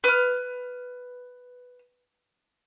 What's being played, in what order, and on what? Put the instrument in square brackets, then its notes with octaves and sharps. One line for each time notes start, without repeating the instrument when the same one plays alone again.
[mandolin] B4 F6